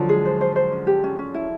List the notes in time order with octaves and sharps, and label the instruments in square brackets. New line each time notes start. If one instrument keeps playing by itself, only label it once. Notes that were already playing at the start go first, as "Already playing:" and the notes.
Already playing: [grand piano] D3 F3 F#3
[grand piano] G#3 [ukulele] G#4
[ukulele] C5
C5
C5
C#4
G4
C#4
C#4
E4